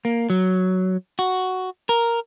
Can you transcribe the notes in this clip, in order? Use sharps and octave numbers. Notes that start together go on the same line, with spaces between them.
A#3
F#3
F#4
A#4